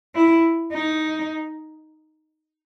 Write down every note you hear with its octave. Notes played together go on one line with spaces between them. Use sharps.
E4
D#4